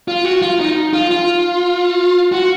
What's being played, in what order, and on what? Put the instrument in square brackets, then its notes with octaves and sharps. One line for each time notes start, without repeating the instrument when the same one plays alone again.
[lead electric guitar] F4
F#4
F4
D#4
F4
F4
F#4